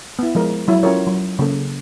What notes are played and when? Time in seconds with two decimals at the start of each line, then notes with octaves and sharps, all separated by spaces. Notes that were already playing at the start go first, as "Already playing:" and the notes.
0.19 B3 E4
0.35 F3 G#3 A#4
0.68 F#3 E4
0.83 C#4 F4 F#4 A4 A#4 C#5
1.07 F#3
1.39 C#3 A#3 A4